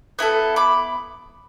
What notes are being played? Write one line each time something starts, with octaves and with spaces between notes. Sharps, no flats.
B3 E4 A4
B5 D6